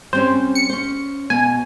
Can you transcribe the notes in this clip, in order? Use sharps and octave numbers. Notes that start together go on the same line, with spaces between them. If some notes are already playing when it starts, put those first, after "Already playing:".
G3 C4 C#4 C5
C#7
C#4 C5
B2 B3 G#5